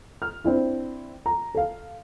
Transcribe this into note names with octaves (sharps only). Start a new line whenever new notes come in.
F6
C4 D4 E4
A#5
A4 F5